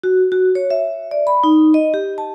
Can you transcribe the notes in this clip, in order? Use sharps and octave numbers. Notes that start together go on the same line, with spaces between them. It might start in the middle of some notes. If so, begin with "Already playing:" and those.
F#4
F#4
C#5
E5
D5
B5
D#4
D#5
G4
A5